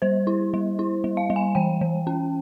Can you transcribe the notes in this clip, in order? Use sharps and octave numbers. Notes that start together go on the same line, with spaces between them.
G3 C5
E4
G3
E4
G3
F5
G3
G#5
E3 G5
E3
C#4